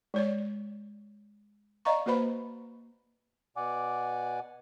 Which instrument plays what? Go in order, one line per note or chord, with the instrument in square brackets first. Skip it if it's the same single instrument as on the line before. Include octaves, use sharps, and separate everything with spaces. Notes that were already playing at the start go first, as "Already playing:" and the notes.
[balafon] G#3 C#5 D5
D5 D#5 F5 A#5 C#6
A#3 F#4 B4 C5 B5
[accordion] B2 D5 F#5 G#5 D6